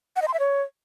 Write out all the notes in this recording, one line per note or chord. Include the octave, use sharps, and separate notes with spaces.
F#5
D#5
C6
E5
C#5